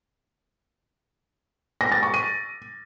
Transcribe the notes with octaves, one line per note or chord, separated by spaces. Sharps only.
A#6
A6
C#6
D#7